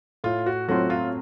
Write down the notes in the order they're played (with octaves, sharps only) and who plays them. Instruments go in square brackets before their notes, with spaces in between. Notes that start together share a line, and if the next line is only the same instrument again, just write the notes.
[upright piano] A2 [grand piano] F4
[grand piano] F#4
[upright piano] F#3 A3 C4 F4 [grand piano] F#4
[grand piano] F4